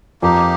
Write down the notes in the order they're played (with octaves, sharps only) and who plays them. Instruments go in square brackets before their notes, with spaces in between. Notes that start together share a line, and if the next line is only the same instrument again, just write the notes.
[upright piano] F2 [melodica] A#3 D#4 G4